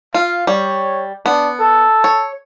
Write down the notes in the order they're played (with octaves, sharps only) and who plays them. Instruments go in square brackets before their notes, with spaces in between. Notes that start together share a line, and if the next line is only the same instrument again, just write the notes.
[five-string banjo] F4 [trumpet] F5
[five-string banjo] G3 [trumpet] C#5
[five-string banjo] B3 [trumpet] D4
[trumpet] A4
[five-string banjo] C#5